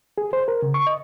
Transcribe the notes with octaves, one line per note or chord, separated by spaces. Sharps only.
G#4
C5
A#4
C#3
C#6
D#5